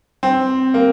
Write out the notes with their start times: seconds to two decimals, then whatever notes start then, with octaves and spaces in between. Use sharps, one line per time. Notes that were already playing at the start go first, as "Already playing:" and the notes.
0.23 C4
0.74 A#3